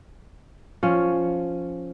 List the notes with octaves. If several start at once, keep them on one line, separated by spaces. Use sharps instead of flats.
F3 C#4